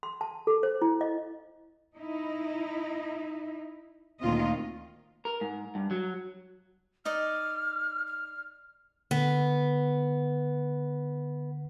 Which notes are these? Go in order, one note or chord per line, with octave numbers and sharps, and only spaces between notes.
C6
A5
A4
C5
E4
D#5
D#4 E4
D2 A#2 D#3 C4 F4 D#5
A#4
G#2
G2
F#3
D#4 D5 D#5 F6
F6
D3 B3